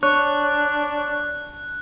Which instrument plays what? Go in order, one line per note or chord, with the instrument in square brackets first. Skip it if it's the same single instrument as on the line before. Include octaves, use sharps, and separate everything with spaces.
[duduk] D4 [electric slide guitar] C#5 [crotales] F#6